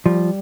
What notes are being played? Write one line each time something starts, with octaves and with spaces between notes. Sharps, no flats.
F3 G3